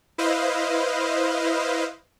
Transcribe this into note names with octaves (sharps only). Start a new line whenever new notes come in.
E4 B4 C5 D#5 F5